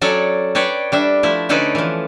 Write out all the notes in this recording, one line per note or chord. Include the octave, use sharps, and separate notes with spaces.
F#3 C#4 A4 C#5 D5
A4 B4 C#5 D5 G5
G3 D4 E5
F3 A3 E4
D3 C#4 D#4 A4 B4 D5
E3 F3